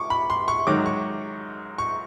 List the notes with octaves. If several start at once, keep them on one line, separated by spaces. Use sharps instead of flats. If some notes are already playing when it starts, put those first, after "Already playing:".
Already playing: C#6 D6
B5
C6
C#6
G#2 D#3 F#3 D6
C#6
C#6